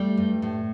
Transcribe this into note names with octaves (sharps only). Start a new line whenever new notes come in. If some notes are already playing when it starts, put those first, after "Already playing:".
Already playing: G3 A3
G2
A2